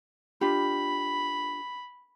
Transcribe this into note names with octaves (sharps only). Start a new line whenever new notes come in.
D4 F4 G4 B5